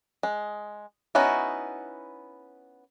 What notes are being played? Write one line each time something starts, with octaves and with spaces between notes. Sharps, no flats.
G#3
B3 C#4 D#4 E4 F#4